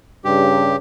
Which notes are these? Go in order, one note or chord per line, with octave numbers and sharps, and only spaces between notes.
G2 C#3 G4